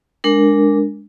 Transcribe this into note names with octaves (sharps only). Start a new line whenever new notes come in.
G#3 D4 A#4